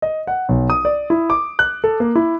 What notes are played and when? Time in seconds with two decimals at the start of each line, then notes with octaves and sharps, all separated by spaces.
0.02 D#5
0.27 F#5
0.49 B1
0.70 D#6
0.85 D5
1.10 E4
1.30 D6
1.59 F#6
1.84 A4
2.00 A#3
2.15 E4